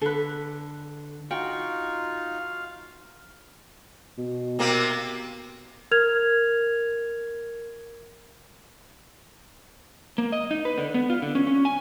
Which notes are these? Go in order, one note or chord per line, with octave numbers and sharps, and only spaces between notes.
D3 A4 B4
D#4 F4 F#4 F5 G5
B2
C3 A#3 C4
A#4 F6 G#6 F7
A#3
D#5
D#4
B4
D3
B3
F4
D3
C#4
C#4
G#5